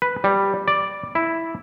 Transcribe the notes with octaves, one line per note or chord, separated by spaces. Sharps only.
B4
G3
D5
E4